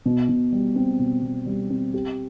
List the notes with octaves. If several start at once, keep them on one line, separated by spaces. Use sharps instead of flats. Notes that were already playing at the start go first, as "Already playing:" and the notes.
B2
B2
G3
C4
B2
B2
G3
C4
G4